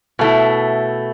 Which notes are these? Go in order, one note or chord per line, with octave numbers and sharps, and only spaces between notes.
B2 A3 E4